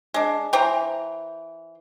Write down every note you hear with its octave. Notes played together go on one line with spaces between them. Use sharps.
G#3 D4
E3 C5 G5 A#5